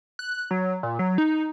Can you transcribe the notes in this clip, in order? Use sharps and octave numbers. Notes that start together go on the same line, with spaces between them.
F#6
F#3
A#2
F#3
D#4